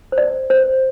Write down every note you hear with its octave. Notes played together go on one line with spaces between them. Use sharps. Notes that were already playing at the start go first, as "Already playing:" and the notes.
C5
D5
C5